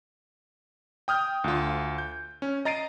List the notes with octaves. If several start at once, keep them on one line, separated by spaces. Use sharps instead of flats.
G5 D#6 F6 G6
D2 F4
G6
C#4
D#5 A#5 A6 C7 D7 D#7